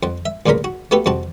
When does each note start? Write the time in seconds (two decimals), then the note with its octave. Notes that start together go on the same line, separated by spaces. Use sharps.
0.03 F2 F#5
0.25 E5
0.46 D2 G2 A#2 C#3 A#4 B5
0.64 F#4
0.91 A3 B3 F#4 G4 A4 B4
1.06 F2 C3 F#4 A5